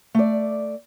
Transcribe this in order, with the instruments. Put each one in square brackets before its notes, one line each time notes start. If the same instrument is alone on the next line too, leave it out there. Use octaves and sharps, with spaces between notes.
[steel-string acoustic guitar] A3 D5